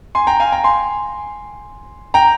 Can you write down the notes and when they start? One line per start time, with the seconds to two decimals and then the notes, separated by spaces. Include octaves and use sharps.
0.15 G#5 C6
0.27 G5 A#5
0.40 F5 G#5
0.52 G5 A#5
0.64 G#5 C6
2.14 G5 A#5